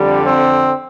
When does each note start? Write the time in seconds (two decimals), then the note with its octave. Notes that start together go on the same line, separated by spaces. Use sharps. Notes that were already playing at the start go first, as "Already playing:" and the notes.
Already playing: F2 D3 G3
0.25 C4